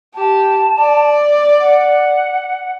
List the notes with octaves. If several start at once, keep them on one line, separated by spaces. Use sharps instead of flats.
G4 A5
D5
F#5